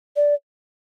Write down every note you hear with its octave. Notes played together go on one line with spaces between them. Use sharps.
D5